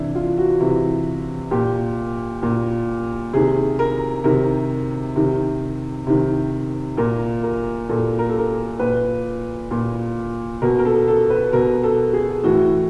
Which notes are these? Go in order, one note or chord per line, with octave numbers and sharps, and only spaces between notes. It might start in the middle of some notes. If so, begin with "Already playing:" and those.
Already playing: C3 E3 D4 E4
F4
F#4
C3 E3
A#2 G4
A#2
C3 D#3 G#4
A#4
C3 D#3 A#4
C3 D#3
C3 D#3
A#2 A#4
A#4
A#2 A4
A#4
A4
A#4
A#2 B4
A#2
B2 A#4
A#4
A4
A4
B4
B2 A#4
A4
G#4
A2 E3 F#4